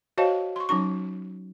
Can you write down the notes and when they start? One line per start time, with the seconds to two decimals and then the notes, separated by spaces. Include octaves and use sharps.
0.18 F#4 C5 C#5 D#5 F5 A5
0.56 C6 C#6
0.69 F#3 C#4 D#4 C#6